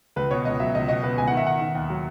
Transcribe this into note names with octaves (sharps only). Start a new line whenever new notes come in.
C#2 B4
B2 C#5
C#2 D#5
F#3 E5
C#2 D#5
B2 D#5
B2 B4
C#2 G#5
F#5
D#3 E5
D#3 F#5
D#3
D#2
F#3